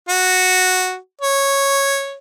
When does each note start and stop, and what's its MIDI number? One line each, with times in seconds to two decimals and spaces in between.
0.09 0.96 66
1.22 2.18 73